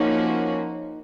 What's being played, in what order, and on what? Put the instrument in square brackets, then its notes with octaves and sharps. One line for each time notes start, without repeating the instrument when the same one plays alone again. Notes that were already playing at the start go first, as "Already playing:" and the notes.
Already playing: [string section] F3 A#3 C#4 F#4 [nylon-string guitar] D#4